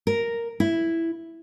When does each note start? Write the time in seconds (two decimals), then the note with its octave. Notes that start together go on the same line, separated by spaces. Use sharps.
0.07 A#4
0.60 E4